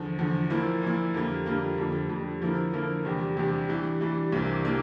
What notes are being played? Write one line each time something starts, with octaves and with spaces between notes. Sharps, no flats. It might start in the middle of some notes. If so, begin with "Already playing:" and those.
Already playing: E2 D3 F3
E2 D3 F3
A#2 F3 A#3 E4
A#2 F3 A#3 E4
F2 D3 G3 A#3 F4
F2 D3 G3 A#3 F4
F2 D3 G3
F2 D3 G3
D3 F3 A#3 E4 A#4
D3 F3 A#3 E4 A#4
E2 C3 G3 D4 G4
E2 C3 G3 D4 G4
E3 G3 D4
E3 G3 D4
C2 C3 E3 A#3 D4
C3 E3 A#3 D4